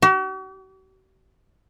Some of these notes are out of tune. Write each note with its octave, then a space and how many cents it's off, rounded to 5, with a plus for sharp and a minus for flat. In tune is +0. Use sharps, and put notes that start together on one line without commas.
F#4 +45